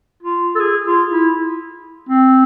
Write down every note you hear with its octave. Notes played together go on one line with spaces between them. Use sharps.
F4
A4
G#4
F4
E4
C4